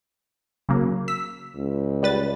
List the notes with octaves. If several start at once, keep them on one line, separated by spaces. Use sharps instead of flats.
C#3 F#3 A#3
E6 B6
C#2
G3 B4 A6